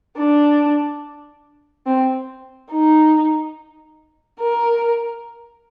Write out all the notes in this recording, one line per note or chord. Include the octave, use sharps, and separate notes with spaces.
D4
C4
D#4
A#4